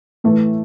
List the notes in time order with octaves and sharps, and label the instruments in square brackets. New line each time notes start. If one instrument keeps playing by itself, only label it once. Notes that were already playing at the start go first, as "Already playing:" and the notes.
[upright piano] A2 E3 A3